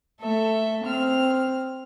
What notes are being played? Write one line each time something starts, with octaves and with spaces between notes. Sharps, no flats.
A3 A4 E5
C4 F6